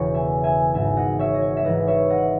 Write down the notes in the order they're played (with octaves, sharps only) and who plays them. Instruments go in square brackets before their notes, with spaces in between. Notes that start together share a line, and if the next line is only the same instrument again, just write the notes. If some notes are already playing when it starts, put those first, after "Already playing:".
Already playing: [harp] E1 E2 C#3 E3 C#5 F#5
E5 G#5
E5 G#5
G#1 G#2 E3 E5 G#5
D#5 F#5
C#5 E5
D#5
C#5
E5
G#1 G#2 E3 B4 D#5
C#5 E5
D#5 F#5